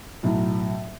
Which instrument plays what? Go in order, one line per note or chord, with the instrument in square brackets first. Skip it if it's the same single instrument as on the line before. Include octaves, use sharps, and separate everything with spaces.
[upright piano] B1 A2 F#3